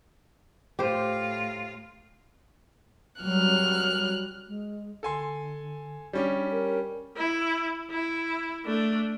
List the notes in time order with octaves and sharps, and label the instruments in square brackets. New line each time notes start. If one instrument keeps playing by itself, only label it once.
[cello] A2 F4 [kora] G4 C5
[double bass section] F#3 G3 [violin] F6 F#6
[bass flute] G#3
[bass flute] D3 [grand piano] A4 G#5 C6
[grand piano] G3 C#4 G4 [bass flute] D4
[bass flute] A#4
[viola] E4
E4
A3 D4